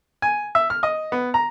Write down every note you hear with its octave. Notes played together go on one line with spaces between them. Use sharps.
G#5
E5
F6
D#5
B3
A#5